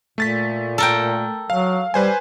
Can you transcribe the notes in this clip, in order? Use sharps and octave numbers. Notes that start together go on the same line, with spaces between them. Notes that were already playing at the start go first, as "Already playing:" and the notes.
A#2 A3 A6 B6
A4 A#4 G5
F#3 F5
G3 B4 C5 G#5